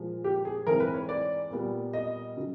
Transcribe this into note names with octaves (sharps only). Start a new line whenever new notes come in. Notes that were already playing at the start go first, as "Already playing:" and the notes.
Already playing: A#2 F3 G#3
G4
G#4
G#2 E3 G#3 C4 A#4
B4
C#5
D5
A#2 G3 B3
D#5
C#3 F#3